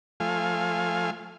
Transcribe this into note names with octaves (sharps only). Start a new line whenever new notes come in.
F3 A3 F5 G#5